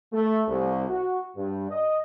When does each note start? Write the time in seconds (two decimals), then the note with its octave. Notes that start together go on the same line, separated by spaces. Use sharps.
0.13 A3
0.48 C2
0.89 F#4
1.36 G2
1.70 D#5